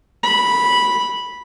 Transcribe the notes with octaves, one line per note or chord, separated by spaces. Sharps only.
B5